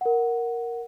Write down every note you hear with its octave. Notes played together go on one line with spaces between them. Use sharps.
A#4 F#5